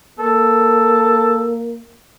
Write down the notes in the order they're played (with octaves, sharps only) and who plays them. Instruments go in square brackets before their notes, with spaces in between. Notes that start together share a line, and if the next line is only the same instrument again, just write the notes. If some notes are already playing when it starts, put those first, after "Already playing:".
[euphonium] A#3 [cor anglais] A4